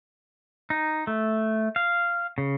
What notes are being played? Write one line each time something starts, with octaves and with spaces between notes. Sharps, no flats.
D#4
A3
F5
C#3